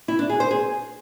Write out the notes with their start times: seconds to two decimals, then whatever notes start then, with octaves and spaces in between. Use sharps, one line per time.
0.08 E4
0.19 D4
0.29 G#4
0.40 C5
0.51 G#4